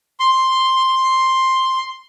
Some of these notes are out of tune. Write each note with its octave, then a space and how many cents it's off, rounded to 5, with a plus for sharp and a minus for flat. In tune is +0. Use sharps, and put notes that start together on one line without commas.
C6 +5